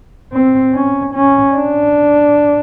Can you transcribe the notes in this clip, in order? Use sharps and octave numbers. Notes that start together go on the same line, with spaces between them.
C4
C#4
C#4
D4